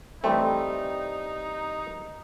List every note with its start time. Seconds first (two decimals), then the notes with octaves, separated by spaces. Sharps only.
0.24 E3 G3 A3 C4 D#4